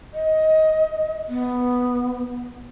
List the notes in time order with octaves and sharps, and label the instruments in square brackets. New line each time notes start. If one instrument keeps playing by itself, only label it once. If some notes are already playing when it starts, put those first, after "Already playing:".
[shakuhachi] D#5
B3